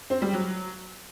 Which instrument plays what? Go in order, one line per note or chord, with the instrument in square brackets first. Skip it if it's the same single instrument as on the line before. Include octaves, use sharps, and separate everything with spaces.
[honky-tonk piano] C4
G3
F#3